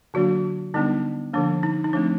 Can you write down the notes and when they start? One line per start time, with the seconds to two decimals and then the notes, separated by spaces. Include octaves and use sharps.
0.14 D3 F#3 A#3 D4 F#4
0.74 D3 G3 B3 D4 D#4
1.34 D3 F3 A#3 D4
1.63 D#4
1.84 D#4
1.93 F3 A3 C4 D4